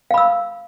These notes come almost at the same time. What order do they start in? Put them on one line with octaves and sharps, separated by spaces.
F5 B5 E6